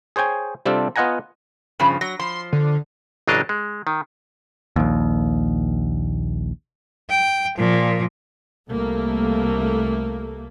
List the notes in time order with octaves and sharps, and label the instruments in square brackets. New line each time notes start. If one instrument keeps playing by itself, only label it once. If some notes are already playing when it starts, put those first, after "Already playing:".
[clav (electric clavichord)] G#4 C5 C#5 G5 G#5
C3 G3 C4 D4 F4 A4
B3 F4 D#5 F#5 G#5 A#5
[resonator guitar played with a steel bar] G2 C#3 F3
[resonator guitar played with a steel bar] F#3 [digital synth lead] A#6
[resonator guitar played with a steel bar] F3 [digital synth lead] C6
[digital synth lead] D3
[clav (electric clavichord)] A1 C#3 F#3 D4 D#5 F5
G#3
D#3
[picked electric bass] A#1 D#2
[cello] G5
A#2 F3
[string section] C2 A3 A#3